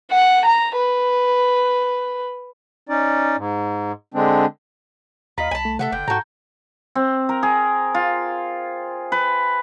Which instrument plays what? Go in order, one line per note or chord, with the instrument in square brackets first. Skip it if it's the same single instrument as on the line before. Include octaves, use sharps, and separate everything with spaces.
[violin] F#5
A#5
B4
[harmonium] C#4 D#4 D5
G#2
D3 G#3 C4 D4
[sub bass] D#2 [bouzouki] F4 [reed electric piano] D#5 A#5 [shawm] B5
[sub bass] C2 [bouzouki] G#5 A5
[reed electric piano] A3
[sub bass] C3 [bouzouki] A4 E5 F#5
[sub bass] F#1 [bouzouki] D3 [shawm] G5
[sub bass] G#2 [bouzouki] F#4 A4 [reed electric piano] A#5 G6
[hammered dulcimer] C4
A#4
G#4
F4
B4